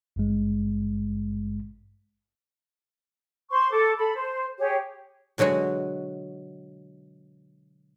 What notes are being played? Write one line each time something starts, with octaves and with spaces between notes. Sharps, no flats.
G#1 G2 G#3
C5 C6 C#6
A4 D6
A4 B5
C5
G4 G#4 C#5
B2 D3 F#3 G#3 F#4